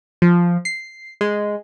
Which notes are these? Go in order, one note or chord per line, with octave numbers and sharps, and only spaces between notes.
F3
C7
G#3